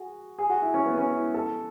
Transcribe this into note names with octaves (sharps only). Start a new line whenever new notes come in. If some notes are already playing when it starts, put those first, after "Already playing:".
Already playing: F#4 G#4
G#4
F#4
E4
C#4
B3
C#4
E4
A4